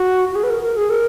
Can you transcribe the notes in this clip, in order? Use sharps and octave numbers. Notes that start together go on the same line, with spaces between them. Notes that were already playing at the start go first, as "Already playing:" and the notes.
Already playing: F#4
F#4
G#4
B4
A#4
A#4
G#4
A#4